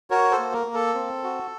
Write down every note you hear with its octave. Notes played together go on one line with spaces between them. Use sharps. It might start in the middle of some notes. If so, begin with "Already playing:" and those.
F#4 A#4 C#5
A4 C5
A#3
A#4
A#3
A4
C4
F#4